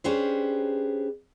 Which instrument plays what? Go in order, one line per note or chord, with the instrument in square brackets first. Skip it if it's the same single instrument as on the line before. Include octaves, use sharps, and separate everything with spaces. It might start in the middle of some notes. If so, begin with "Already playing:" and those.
[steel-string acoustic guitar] C#4 D4 G4 G#4 B4 C5